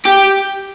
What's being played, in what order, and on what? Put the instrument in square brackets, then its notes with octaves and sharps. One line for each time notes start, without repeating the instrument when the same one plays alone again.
[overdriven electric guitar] G4